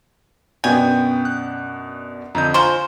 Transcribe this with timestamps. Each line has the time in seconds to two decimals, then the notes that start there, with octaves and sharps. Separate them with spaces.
0.64 F#2 B2 B3 D4 G5 G#5 G6
1.25 F#6
2.35 F2 D3 D#5 A#5 G6
2.54 F3 C5 G#5 A#5 C#6